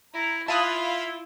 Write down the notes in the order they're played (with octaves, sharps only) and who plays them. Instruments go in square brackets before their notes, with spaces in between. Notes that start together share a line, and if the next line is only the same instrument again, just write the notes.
[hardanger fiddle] E4 [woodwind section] A#5
[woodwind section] E4 [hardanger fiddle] F4 [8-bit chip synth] E5 F5 B5 [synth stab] A5 D#6 F#6